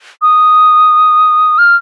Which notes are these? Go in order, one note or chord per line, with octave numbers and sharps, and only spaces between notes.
D#6
F6